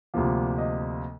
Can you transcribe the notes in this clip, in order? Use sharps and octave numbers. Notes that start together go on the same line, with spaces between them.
D2 C3 F3 A#3
D#5